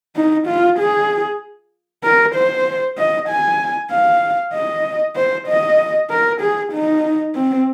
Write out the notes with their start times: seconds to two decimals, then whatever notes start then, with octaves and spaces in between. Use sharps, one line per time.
0.16 D#4
0.47 F4
0.79 G#4
2.04 A#4
2.35 C5
2.98 D#5
3.29 G#5
3.91 F5
4.53 D#5
5.16 C5
5.48 D#5
6.10 A#4
6.41 G#4
6.72 D#4
7.35 C4